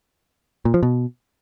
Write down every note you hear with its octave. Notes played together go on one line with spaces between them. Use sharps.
A#2
F3
B2